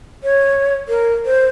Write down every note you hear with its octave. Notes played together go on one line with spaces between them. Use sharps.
C#5
A#4
C5